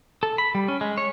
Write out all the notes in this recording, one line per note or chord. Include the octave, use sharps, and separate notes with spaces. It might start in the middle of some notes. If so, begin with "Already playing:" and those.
A4
B5
G3
C#4
G#3
C#5